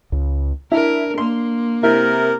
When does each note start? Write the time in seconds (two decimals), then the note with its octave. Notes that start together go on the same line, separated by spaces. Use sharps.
0.12 C#2 C#3
0.72 D4 E4 A#4
1.18 A#3 C6
1.83 C3 E4 A#4